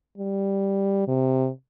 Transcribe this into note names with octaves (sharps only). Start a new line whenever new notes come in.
G3
C3